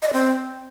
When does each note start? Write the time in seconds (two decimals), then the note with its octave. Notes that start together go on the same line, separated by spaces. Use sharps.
0.02 D#5
0.08 D5
0.13 C4